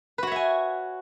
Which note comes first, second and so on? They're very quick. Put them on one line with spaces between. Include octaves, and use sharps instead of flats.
B4 F#4 C#5 E5 G#5